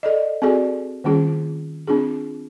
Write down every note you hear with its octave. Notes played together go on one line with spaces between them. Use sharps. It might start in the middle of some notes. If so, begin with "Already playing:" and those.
A4 D5 D#5
C4 F#4 G#4 A4 D5 G#5
D#3 G3 A#3 C#4 F4 G#4
C4 D4 F4 G#4